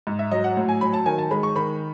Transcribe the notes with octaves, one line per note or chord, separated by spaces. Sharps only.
G#2
E5
F#3 D#5
F#5
A2
G#5
F#3 B5
A5
D#3 G#5
A5
G#3 B5
C#6
D#3 B5